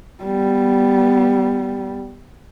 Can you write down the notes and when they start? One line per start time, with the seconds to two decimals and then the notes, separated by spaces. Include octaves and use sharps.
0.24 G3 B3